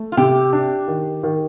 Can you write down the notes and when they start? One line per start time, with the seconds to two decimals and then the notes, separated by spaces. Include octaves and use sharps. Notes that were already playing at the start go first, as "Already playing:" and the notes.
Already playing: A3
0.12 F4
0.17 C3 G4
0.53 D4
0.88 D#3
1.23 D#3